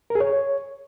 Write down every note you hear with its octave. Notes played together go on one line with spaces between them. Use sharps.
A#4
G#4
C#5